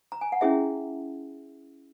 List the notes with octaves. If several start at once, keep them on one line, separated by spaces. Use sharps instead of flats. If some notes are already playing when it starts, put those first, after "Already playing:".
A#5
G#5
F#5
C#4 E4 G#4 E5